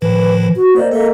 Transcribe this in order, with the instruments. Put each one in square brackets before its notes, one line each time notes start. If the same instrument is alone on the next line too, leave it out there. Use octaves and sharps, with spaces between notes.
[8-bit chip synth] A2 D#3 F3 [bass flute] B4
[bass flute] F#4
[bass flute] A#3 [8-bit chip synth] C5 D5 D#5
[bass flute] A#3 [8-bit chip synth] A4 D#5 E5